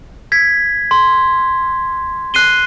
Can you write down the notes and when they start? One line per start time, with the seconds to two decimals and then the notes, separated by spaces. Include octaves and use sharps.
0.32 G#6 B6
0.91 C6
2.34 F#6 C7 D#7 G7